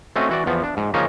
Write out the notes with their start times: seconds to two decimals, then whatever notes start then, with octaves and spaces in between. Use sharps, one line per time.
0.16 A3 C4 C#4 F#4 D#5
0.29 E3 F#4 D5
0.46 E2 F3 B3
0.64 D4
0.77 G#2
0.94 C#3 F3 A#3 C#4 D#4 C#5